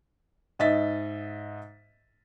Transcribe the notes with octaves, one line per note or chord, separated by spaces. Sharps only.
G#2 D#5 E5 A6 B6